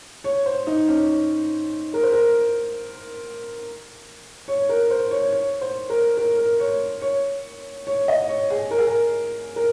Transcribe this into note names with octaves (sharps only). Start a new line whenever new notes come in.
C#5
C5
D#4
C#4
A#4
C5
A#4
C#5
A#4
C5
C#5
C#5
C5
A#4
A#4
A#4
C#5
C#5
C#5
D#5
C#5
G#4
A#4
G#4
A#4
A#4